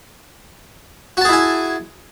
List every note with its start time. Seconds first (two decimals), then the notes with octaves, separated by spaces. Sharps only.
1.17 F#4
1.21 A5
1.25 G#4
1.29 E4
1.33 G#5